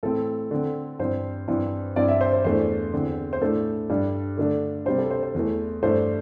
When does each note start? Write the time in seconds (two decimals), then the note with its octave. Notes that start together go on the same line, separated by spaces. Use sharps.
0.03 A2 E3 C4 A4
0.51 D3 C4
0.99 G2 E3 C4 C5
1.48 G2 E3 C4
1.96 G2 E3 C4 D5
2.08 E5
2.21 C5
2.33 C5
2.44 E2 E3 A3 D4 C5
2.93 E2 D3 C4
3.33 C5
3.42 A2 A3 D4 A4
3.90 G2 G3 D4
4.37 D3 A3 D4
4.86 C3 G3 D4 C5
4.98 A4
5.11 C5
5.23 C5
5.34 E2 E3 A3
5.83 G2 E3 A3 D4 C5